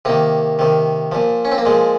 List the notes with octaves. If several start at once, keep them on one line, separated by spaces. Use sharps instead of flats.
C3 D#3 A#3
C3 D#3
A#2 F3
C#4
C4
A#3
A#2 F3 G#3